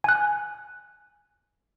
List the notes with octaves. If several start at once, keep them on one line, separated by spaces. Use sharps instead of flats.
G#5 F#6